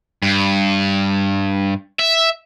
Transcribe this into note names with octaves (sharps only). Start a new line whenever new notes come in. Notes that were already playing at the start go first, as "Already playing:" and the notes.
G2
E5